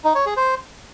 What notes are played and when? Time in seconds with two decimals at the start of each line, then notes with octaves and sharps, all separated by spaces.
0.04 D#4
0.15 C#5
0.26 G#4
0.37 C5